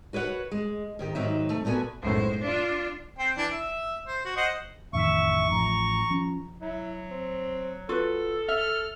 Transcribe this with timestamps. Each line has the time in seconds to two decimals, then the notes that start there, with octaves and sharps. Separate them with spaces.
0.13 F#4 B4 C#5 D#5 F#5
0.51 G#3
0.99 G#2 D#3 G4
1.15 D#2 G#2 D#3 F#3 D#4 E5
1.50 C3 A3
1.65 A#2 A3 B3 F#4 G#5
2.03 B1 F#2 A2 G#3 C5
2.42 D4 F4
3.19 C4 C5 G5
3.37 E3 D4
3.51 E5
4.07 C5
4.25 F#4
4.37 C5 D#5 F#5
4.93 A1 F2 D#3 E5 C#6
5.50 A1 F3 A#5
6.10 F3 C#4
6.61 F#3 E4
7.11 C4
7.89 F4 F#4 A4 B4
8.48 E5 F6